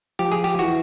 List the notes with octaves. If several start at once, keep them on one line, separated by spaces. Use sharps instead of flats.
F3 G4
G#4
G4
E3 F#4